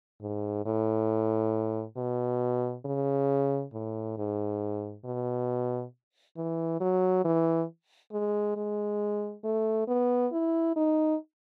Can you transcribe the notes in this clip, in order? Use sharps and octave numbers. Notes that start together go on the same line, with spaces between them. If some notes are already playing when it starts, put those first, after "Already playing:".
G#2
A2
B2
C#3
A2
G#2
B2
E3
F#3
E3
G#3
G#3
A3
B3
E4
D#4